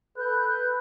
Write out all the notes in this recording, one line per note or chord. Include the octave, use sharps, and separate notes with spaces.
A4 B4 F#6 G6